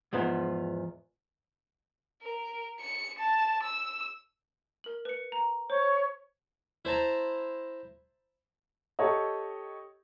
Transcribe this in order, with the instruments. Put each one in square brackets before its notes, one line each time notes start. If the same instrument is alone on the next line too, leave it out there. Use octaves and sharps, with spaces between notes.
[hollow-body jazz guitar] E2 G#2 F3 B3
[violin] A#4
C#7
A5
E6
[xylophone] A#4 F#7
B4 C#7
A#5
[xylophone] C5 [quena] C#5
[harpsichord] E4 C5 A5 A#5
[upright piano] G4 A4 C#5 D#5